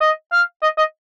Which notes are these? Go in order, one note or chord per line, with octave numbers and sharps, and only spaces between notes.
D#5
F5
D#5
D#5